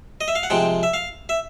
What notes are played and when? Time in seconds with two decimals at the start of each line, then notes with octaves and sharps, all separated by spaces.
0.21 D#5
0.28 E5
0.35 F5
0.43 F#5
0.50 C3 F3 G#3 G5
0.83 E5
0.94 F5
1.29 E5